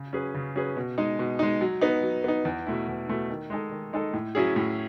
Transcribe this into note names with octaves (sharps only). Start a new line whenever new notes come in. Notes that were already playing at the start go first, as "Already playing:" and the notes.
Already playing: C#3
F#3 C#4 G#4 B4
C#3
F#3 C#4 G#4 B4
B2
G#3 D#4
B2
G#3 D#4
F#3
B3 D#4
F#3
B3 D#4
E2
B2 A3 E4
E2
B2 A3 E4
D#3
G#3 D#4 A4
D#3
G#3 D#4 A4
A2
F#3 C#4 E4 G#4
A2